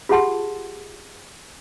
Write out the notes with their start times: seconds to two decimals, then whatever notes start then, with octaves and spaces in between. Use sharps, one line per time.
0.09 F4 G4 G#4 F#5 A5 C6